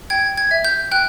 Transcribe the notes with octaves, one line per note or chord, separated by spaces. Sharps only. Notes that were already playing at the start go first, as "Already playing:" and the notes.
G5 G#6
G#6
E5
G6
G5 F#6